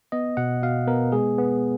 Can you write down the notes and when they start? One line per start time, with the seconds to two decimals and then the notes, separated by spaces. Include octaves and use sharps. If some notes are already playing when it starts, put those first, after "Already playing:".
0.12 B3 D#5
0.37 B2 F#5
0.63 B2 F5
0.87 B3 A#4
1.12 G#3 G#4
1.38 B3